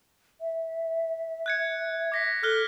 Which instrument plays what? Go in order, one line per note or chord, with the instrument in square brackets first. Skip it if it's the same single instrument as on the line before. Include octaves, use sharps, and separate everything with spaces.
[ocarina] E5
[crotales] F#6 G#6 C#7
D6 A#6 B6
[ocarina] A4 [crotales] F6 F#6 G7